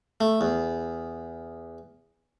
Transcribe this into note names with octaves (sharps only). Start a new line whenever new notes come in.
A3
E2